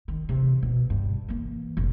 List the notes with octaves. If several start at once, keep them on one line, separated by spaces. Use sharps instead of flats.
D#3
C3 E3
B2
G2
E3 A#3
F1 A#1